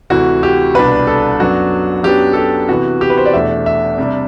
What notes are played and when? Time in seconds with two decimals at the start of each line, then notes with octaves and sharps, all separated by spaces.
0.10 D2 C3 E3 F#4
0.43 G4
0.74 C2 B2 G3 D4 B4
1.07 A4
1.40 F#2 F#3 B3 D4 F#4
2.04 F#2 F#3 B3 D4 G4
2.33 A4
2.36 G4
2.69 C3 E3 B3 F#4
3.01 G4
3.10 B4
3.17 C5
3.25 D5
3.33 E2 B2 A3 D4 E5
3.66 E5
3.98 C3 G3 D4